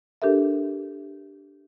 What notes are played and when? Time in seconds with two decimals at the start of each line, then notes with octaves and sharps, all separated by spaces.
0.22 D4 G4 A4 A#4 E5